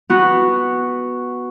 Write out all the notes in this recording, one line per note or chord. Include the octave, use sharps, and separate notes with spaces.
B3 F#4